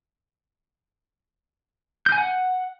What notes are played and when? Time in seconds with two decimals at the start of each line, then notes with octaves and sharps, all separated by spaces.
2.06 G6
2.12 G#5
2.18 F#5